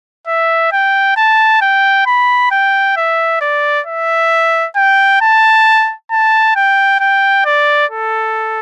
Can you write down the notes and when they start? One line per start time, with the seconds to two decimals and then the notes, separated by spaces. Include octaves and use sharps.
0.27 E5
0.72 G5
1.17 A5
1.61 G5
2.06 B5
2.51 G5
2.96 E5
3.41 D5
3.86 E5
4.76 G5
5.21 A5
6.11 A5
6.56 G5
7.00 G5
7.45 D5
7.91 A4